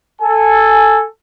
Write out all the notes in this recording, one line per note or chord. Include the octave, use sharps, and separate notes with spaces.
A4 G#5